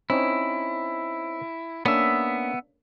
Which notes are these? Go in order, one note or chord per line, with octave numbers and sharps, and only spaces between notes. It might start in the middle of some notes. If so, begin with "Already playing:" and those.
C4 C#4 D#4 E4
A#3 B3 C#4 D4 E5